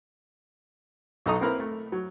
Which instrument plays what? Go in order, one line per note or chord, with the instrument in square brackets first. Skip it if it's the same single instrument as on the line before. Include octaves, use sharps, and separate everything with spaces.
[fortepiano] B1 D#4 A4 A#5 C#6 D#6
A#3 C4 E4 A#4 B4
A3
F#3